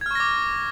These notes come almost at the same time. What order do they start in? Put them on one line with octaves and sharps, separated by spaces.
G#6 F6 C#6 A#6 D6